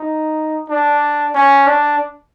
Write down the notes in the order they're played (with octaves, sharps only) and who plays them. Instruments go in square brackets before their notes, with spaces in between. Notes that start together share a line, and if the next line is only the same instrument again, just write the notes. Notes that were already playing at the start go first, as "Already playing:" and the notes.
Already playing: [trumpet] D#4
D4
C#4
D4